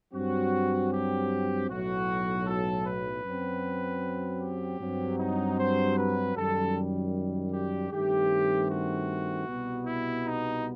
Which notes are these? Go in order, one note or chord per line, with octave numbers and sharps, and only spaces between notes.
G2 F#3 C4 F#4
G4
B1 A2 F#3 F#4
A4
B4
F#2 F#3 C4
G4
G2 F#3 C4
D#4
C5
B4
F#2 D#3 G3 A4
G4
G2 D#3 A3 C4 G4
F#4
C2 B2 G3 B3
E4
D#4